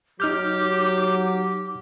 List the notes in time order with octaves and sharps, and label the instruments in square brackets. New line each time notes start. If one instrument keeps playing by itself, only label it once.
[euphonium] F#3 [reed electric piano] D#4 F6 G6 [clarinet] G4 [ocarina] D6